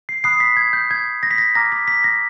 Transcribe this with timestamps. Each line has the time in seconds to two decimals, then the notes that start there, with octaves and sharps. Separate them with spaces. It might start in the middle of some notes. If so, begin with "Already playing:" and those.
0.09 C7
0.24 B5 D#6 F#6 C7
0.40 B6
0.57 G#6
0.73 G6
0.91 G#6
1.23 A#6
1.31 B6
1.38 A#6
1.55 A#5 D6 F6 A#6
1.72 B6
1.88 B6
2.04 A#6